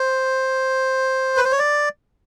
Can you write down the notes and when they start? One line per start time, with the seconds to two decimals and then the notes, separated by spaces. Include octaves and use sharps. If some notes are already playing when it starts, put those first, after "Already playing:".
Already playing: C5
1.37 B4
1.45 C5
1.52 C#5
1.59 D5